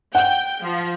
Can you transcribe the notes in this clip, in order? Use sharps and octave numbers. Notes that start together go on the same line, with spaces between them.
F#5 G5 G6
F3